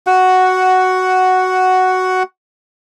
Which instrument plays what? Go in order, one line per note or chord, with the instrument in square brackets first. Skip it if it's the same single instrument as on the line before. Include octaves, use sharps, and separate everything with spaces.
[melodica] F#4 F#5